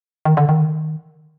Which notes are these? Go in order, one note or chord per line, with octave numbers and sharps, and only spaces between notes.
D#3
D3
D#3